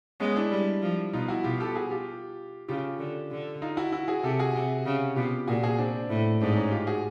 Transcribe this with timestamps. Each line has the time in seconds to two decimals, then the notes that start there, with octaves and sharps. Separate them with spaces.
0.20 G#3 B3 C#4
0.36 D4 E4
0.51 G3
0.82 F3
1.13 B2 D#4 F4
1.28 E4 F#4
1.44 B2 F4 G4
1.60 G4 A4
1.75 F#4 G#4
1.91 F4 G4
2.68 C#3 F4 G4
2.99 D3
3.31 D3
3.62 D#4 F4
3.77 E4 F#4
3.92 E4 F#4
4.08 F#4 G#4
4.24 C3 G4 A4
4.39 F#4 G#4
4.55 C3
4.86 C#3
5.16 B2 F4 G4
5.48 A#2 F#4 G#4
5.63 F#4 G#4
5.78 C4 D4
6.10 A2
6.41 G#2 C4 D4
6.56 C#4 D#4
6.71 F4 G4
6.87 F#4 G#4